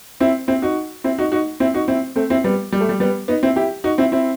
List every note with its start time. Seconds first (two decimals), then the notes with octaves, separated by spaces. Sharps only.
0.20 C4 E4
0.48 C4 E4
0.62 D#4 F#4
1.04 C4 E4
1.18 D#4 F#4
1.32 D#4 F#4
1.60 C4 E4
1.74 D#4 F#4
1.88 C4 E4
2.16 A3 C4
2.30 C4 E4
2.44 G3 B3
2.72 G3
2.81 A3
2.89 G3
3.00 G3 B3
3.28 B3 D#4
3.43 C4 E4
3.56 E4 G4
3.84 D#4 F#4
3.98 C4 E4
4.12 C4 E4